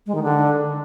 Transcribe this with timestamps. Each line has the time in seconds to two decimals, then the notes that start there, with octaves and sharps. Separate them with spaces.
0.06 G#3
0.15 D#3
0.23 D3